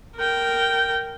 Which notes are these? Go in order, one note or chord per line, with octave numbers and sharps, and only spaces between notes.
A#4 G5